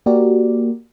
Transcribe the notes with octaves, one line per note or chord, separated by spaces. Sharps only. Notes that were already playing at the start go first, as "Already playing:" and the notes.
A#3 F#4 G4 A#4 D5